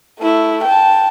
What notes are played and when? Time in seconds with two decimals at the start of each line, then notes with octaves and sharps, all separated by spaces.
0.20 A3 E4
0.64 G5 A5